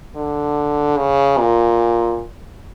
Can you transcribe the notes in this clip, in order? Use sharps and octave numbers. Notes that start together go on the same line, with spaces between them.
D3
C#3
A#2